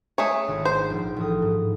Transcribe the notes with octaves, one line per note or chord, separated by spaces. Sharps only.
A3 G#4 C#5
G#1 D4 F4
C5
A#1
A1 A2 D#6
G#2